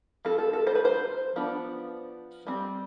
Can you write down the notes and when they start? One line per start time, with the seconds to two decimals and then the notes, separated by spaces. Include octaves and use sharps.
0.25 F3 C4 A4
0.38 A4
0.53 A4
0.67 C5
0.75 B4
0.85 C5
1.36 F3 B3 D4
2.47 G3 C4